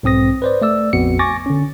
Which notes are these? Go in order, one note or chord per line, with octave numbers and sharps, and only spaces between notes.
B1 G#2 C4 D#6 A#6
B4 C5 D5
A3 D5 E6
A#1 F2 B3 F#4 C#7
G#5 C#6 D6 A6 A#6
D3 C#4